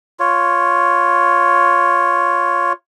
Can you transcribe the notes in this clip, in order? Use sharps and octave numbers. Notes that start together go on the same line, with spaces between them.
F4 C#5